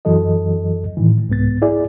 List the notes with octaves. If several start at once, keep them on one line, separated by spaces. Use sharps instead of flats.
F#2 E3 F#3 A4 D#5
A2 D#3 E3
C2 G#2 B3 A6
E4 G#4 D5